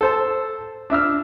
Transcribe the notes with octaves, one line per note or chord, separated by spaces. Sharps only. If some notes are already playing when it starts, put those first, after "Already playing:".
A4 C5 A5
D4 E5 E6 F6